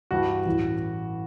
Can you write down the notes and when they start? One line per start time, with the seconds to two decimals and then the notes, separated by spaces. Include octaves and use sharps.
0.11 G2 E3 G3 F#4
0.46 A1 A2 E3